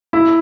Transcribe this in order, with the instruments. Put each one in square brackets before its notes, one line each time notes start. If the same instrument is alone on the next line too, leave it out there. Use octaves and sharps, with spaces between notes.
[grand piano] E4